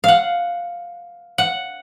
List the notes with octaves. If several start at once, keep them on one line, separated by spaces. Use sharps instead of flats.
F5 F#5
F#5